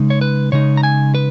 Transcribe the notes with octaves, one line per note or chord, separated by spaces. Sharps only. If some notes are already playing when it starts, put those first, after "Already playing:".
Already playing: C#3 G#3 D#4
C#5
B4
C#3 G#3 D#4 C#5
A#5
G#5
B4